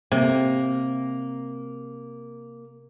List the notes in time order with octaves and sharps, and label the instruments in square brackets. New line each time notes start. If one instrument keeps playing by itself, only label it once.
[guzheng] C3 [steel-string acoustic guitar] A#3